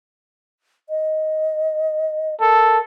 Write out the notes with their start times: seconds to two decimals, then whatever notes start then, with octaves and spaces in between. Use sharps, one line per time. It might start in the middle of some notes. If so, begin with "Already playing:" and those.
0.90 D#5
2.41 A4 A#4